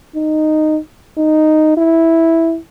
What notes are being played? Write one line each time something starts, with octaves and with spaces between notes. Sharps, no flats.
D#4
D#4
E4